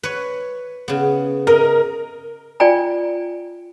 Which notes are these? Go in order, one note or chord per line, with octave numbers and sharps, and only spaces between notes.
B4 C#5
C#3 B3
A#4 D#5
F4 D5 G5 G#5 A#5